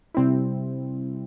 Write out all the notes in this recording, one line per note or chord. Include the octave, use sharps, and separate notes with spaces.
C3 G3 C4 E4